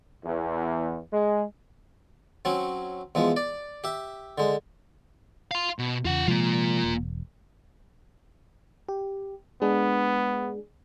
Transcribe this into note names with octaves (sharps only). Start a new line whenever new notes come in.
E2
G#3
F#3 C4 C#4
E2 F3 G#3
D5
G4 E5
D3 G#3
F5 C6
B2
E2 C#3 F4 F#5
C3 F3 G#3 A#3 F4
E1
G4
G#3 B3 D4 G#4